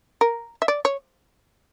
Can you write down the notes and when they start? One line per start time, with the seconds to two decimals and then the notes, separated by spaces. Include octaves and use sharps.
0.21 A#4
0.62 E5
0.68 D5
0.85 C#5